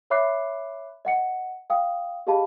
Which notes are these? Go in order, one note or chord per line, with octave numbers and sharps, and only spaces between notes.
C#5 E5 B5 D6 F#6 C7
D#5 F#5 C#7
F5 G5 D#6
G4 G#4 D#5 F5 A5 B5